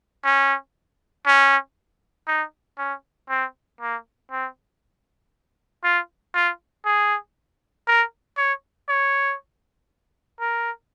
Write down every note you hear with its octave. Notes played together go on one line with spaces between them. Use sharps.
C#4
C#4
D#4
C#4
C4
A#3
C4
F4
F4
G#4
A#4
C#5
C#5
A#4